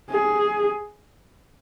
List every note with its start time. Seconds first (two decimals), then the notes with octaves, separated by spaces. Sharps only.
0.11 G#4